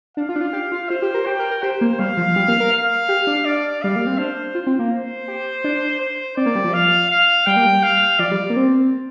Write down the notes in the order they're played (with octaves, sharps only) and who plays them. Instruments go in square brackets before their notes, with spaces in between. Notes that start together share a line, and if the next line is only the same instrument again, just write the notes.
[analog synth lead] D4 [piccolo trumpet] F5
[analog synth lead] F4
D4
F4
G4
F4
[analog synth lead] F4 [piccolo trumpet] C5
[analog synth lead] G4
A#4
[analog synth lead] G4 [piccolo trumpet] G5
[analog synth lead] A#4
A#4
[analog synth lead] G4 [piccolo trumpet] C5
[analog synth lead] A#3
[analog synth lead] G3 [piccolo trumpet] F5
[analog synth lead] F3
G3
A#3
A#4
[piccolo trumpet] F5
[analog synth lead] G4
D4
[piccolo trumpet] D5
[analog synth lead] G3 [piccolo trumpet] F5
[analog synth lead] A#3
C4
[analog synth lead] D4 [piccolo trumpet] C5
[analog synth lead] F4
C4
A#3
[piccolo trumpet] C5
[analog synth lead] G4
D4
[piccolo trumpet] C5
[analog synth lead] C4 [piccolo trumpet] D5
[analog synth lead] A#3
G3
F3
[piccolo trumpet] F5
F5
[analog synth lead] G3 [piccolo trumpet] G5
[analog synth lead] A#3
G3
[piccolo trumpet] F5
[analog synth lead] F3 [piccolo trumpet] D5
[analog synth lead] G3
A#3
C4